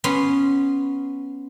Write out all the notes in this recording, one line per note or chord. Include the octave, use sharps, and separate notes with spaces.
B3 C#4 C6